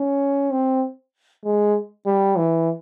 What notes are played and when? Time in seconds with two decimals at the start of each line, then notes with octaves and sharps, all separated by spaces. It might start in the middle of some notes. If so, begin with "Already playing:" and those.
Already playing: C#4
0.51 C4
1.44 G#3
2.06 G3
2.37 E3